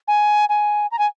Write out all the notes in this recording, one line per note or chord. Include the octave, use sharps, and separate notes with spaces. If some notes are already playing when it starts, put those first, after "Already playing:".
G#5
G#5
A#5
G#5